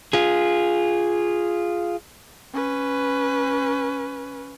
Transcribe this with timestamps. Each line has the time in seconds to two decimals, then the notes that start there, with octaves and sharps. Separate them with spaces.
0.13 F4 G#4
2.54 C#4 B4